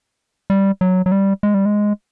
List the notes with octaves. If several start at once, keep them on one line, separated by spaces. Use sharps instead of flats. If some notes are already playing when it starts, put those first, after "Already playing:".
G3
F#3
F#3
G3
G#3
G3
G#3